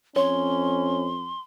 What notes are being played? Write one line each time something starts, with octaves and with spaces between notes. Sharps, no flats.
F2 C#4 C#5 C6